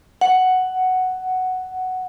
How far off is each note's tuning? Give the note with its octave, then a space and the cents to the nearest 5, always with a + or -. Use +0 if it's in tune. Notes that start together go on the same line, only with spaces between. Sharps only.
F#5 +5